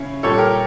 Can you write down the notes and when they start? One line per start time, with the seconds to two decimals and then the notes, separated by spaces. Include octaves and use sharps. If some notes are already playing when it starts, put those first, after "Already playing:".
Already playing: C#3 C#4 E4
0.23 A#2 G3 A4 C#5
0.38 G4 A#4